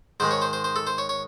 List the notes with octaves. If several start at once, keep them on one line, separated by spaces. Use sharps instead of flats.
G#2 D#3 G#3 C5
C#5
C5
C5
C5
A4
C5
C#5
C#5